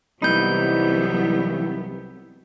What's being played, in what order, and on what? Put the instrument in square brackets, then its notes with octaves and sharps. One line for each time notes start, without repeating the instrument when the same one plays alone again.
[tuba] C2 [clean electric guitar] E3 C4 D#4 [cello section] F#3 B3 [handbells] B5 G6